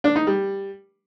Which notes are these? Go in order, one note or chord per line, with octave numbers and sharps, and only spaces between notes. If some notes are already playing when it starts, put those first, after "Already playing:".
D4
D#4
G3